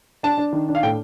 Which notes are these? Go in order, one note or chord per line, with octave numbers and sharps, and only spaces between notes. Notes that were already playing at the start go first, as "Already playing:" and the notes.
D4 A5
D4
D#3
D4
F5
A2 G5